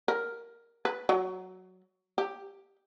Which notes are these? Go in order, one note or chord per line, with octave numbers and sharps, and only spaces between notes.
A#4
B4
F#3
G4